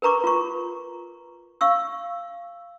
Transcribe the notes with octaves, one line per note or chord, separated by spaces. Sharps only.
A#4 B4 A#5 C#6 D6
F4 C#6
F5 C#6 E6